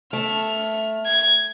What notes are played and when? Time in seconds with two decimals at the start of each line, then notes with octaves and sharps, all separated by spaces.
0.13 A3 F6
1.06 G#6